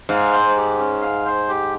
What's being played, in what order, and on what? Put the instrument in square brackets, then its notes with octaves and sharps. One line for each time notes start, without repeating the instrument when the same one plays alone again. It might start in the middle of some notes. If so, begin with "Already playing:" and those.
[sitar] G#2 [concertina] F5
[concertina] C5
G4
C#4
F5
C5
G4